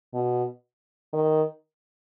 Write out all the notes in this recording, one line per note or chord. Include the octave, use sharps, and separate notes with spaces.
B2
D#3